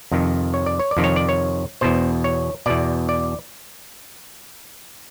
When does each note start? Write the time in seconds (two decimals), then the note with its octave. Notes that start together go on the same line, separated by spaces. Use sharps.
0.12 F2 C3 D#3
0.54 C#5
0.66 D5
0.79 C#5
0.91 D5
0.97 F2 C3 D#3
1.04 C#5
1.16 D5
1.29 C#5
1.81 E2 B2 C5
2.24 C#5
2.66 E2 B2 D5
3.09 D5